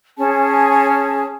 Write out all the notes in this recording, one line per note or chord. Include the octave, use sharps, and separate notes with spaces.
C#4 G#4 A5